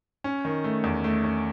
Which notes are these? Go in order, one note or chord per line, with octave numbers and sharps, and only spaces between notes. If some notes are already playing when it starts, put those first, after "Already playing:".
C#4
D#3
A3
E2
A3
C#4